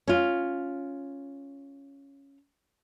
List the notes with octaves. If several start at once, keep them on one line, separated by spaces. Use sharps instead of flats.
C#4 F4